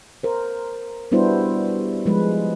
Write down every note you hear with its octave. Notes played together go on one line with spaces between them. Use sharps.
A#4 C5
G3 B3 D4 E4 F#4 C5
F3 G#3 B4